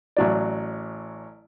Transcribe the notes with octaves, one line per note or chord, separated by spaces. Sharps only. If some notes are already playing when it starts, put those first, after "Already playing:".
A1 F#3 D5